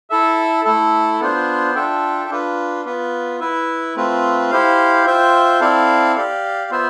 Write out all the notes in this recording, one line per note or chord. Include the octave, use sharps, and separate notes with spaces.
E4 A4 E5
A3 E4 A4
B3 D4 F4 C5
D4 F4 A4 E5 G5
D4 F4 B4
B3 F4 B4
E4 B4 E5
A3 C4 F4 B4
E4 G4 C5 F5
F4 C5 E5 G5
C4 E4 A4 D5 F5
G4 D5 F5
B3 F4 C5 E5